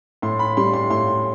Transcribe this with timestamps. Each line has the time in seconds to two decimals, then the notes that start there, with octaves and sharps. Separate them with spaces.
0.22 A2 C6
0.39 B5
0.57 G3 C6
0.74 C6
0.90 A2 C6